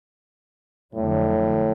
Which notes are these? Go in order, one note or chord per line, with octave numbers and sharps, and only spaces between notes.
F2 A2 D3 F#3